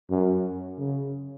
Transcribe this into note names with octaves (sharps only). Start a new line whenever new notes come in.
F#2
C#3